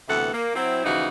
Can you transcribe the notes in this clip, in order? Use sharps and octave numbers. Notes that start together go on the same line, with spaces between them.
D2 C3 E3 B3 A4 F#5
A#3
F#3 C4 E4
D#2 C#3 E3 F3 D#4 F#4